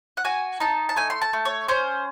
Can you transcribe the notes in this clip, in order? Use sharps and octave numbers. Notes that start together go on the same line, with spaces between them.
F#5
F#4 G#5
D#4 A5
A5
A3 G#5
C6
A5
A3
C#5
C#4 C5